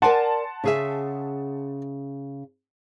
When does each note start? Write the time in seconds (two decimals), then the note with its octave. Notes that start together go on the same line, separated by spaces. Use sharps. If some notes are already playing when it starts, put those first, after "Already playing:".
0.02 A#4 D5 F#5 G#5 A5 C6
0.64 C#3 G#4 E5